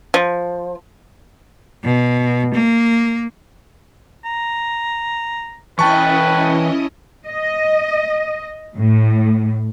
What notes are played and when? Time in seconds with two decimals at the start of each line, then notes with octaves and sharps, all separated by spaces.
0.14 F3
1.84 B2
2.54 A#3
4.25 A#5
5.79 E3 C#4 E4 B4 D#5 G5 A5 C#6
7.26 D#5
8.77 A2